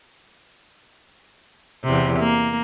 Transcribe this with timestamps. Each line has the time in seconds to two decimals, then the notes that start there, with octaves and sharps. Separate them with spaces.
1.83 E2 C3
2.19 A#3